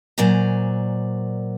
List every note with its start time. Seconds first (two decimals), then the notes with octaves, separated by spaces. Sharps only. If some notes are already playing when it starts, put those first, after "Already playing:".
0.18 A#2 F#3 C5 D5 G#5 A#5